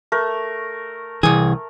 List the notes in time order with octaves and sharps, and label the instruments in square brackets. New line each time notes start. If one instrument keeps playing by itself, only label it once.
[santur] A3 A#4
[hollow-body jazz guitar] C2 G#4 [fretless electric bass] E3